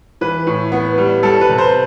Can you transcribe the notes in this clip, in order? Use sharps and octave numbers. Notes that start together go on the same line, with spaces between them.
E3 B4
A2
B3
G3
G3 A4
B4
C3
C5